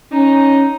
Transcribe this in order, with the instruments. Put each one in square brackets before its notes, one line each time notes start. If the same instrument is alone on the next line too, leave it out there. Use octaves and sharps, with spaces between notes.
[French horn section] C#4 [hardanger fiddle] D#4